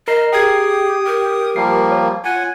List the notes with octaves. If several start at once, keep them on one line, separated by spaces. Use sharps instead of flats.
A#4 D#5 A#5 C7
G4 G#4 G5 D#6 G#6 C7
A#4
F3 G3 A#3 C7
C#5
F4 F#5 G#5